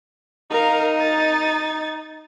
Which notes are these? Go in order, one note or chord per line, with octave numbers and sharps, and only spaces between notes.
D#4 A#4 F5
A6